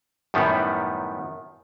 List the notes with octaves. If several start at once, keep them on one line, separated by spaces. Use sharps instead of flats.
F#2 A2 D#3 G3 B3